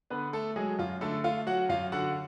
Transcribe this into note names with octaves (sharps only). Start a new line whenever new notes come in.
D3 B3 B4
A3 A4
F#3 G#3 G#4
F#2 F4
D3 A3 A4
A3 F4 F5
F#3 F#4 F#5
F#2 F4 F5
D3 F#4 F#5